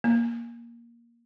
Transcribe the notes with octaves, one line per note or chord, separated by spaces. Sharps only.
A#3